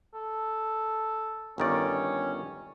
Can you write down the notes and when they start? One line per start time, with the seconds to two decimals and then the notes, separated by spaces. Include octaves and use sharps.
0.14 A4
1.58 G1 D#3 C#4 D5